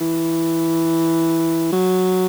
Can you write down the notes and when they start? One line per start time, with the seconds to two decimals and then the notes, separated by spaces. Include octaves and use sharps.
0.01 E3
1.72 F#3